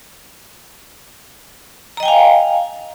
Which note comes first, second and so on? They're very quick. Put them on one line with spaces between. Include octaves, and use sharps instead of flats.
A#5 D#5 G5 G#5 F5